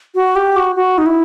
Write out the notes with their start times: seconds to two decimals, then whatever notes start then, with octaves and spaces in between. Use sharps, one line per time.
0.15 F#4
0.36 G4
0.56 F#4
0.76 F#4
0.98 D#4
1.06 E4